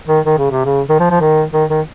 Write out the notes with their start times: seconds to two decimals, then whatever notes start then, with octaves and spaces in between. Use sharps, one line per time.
0.08 D#3
0.25 D#3
0.38 C#3
0.51 C3
0.65 C#3
0.89 D#3
1.00 F3
1.10 F3
1.21 D#3
1.53 D#3
1.69 D#3